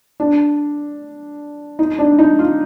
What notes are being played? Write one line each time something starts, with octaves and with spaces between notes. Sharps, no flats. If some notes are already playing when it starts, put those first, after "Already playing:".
D4
D#4
D4
D#4
F4